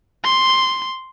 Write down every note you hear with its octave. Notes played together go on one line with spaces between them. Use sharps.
C6